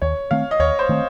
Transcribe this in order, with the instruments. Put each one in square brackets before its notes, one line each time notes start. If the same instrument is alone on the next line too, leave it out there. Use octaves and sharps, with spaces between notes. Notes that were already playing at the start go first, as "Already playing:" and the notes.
[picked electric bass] D#2 [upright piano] C#5
[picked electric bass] D#3 A3 C4 [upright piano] F5
[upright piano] D#5
[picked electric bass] D#2 [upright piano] C#5
[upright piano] C5
[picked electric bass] D#3 A3 C4